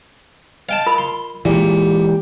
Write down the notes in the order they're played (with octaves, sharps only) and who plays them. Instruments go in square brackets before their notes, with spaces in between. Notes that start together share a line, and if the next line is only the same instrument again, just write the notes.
[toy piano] D#5 [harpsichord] F5 G5 A5
[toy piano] F4 A#4 B5
[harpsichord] C6
[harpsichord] A#2 [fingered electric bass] E3 G#3 [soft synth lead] G4